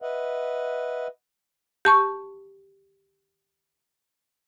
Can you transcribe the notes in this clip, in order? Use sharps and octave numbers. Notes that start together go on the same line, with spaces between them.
B4 D#5 E5 F#5
G4 A5 C#6